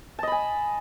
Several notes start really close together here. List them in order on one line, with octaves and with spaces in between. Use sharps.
A5 D#5 B5 G#5